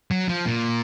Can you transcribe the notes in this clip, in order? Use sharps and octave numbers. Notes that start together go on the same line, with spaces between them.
F#3
F3
A#2